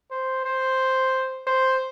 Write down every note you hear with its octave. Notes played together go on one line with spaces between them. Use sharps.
C5
C5
C5